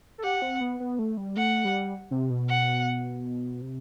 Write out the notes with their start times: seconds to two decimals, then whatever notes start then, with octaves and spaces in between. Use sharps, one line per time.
0.18 A4
0.24 G4 F#5
0.42 C4
0.61 B3
0.80 B3
0.99 A3
1.17 G3
1.36 A3 F#5
1.65 G3
2.11 C3
2.30 B2
2.49 F#5
3.61 C3